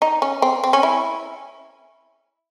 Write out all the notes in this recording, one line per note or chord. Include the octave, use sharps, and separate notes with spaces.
D#4
C#4
C4
C4
C#4
E4